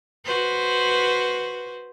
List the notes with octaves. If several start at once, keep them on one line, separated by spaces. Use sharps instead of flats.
F#4 B4 C5